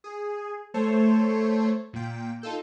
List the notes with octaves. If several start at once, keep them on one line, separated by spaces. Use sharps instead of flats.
G#4
A3 A4 C5 C#5
A#2 G5
D#4 F4 A4 G6